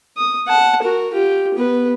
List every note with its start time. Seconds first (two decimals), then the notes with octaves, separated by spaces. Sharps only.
0.17 D#6
0.48 F#5 A5
0.82 F#4 A#4
1.13 F4 G4
1.55 B3 B4